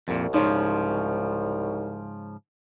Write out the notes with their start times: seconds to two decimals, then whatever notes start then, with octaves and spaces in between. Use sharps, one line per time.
0.08 C2 F2 A#2
0.34 G#2 C#3 F3 D#4 C#5 C6